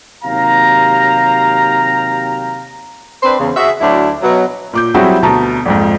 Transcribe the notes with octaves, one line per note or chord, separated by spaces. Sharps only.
D#2 C3 F#3 F5 G5 A#5
C4 D4 B4 C5
E2 C#3
F#4 G#4 E5
D2 F#3 D4 E4
B2 F#3
A#2 D6 G6
F#3 G3 C4 E4 F#4 G#4
D2 B2 A5 A#5
A#1 F2 G#2